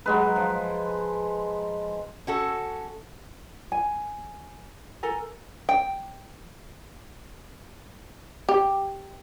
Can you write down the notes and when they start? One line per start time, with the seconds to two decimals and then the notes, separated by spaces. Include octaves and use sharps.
0.06 F#3 G#3 B4
0.36 F3
2.27 C#4 F#4 A4
3.72 G#5
5.03 A4 A#4 G#5
5.69 G5
8.49 G4